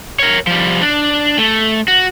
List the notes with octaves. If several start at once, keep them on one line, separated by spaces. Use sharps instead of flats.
A#4 C#5
F3 G3
D4
A3
F#4